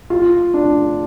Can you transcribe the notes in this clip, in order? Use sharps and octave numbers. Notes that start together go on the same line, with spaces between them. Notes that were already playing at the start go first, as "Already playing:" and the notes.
F4
D4